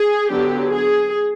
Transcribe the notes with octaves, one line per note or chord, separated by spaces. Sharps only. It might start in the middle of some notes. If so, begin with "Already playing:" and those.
Already playing: G#4
D3 F#3 B3 D4 G4
G#4